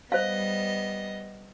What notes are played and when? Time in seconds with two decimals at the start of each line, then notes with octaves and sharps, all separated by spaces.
0.12 G3 B3 C5 D#5 F5